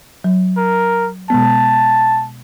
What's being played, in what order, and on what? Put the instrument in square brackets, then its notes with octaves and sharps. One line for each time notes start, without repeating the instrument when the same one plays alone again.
[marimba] F#3
[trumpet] A#4
[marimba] B2 G#3 B3 [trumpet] A5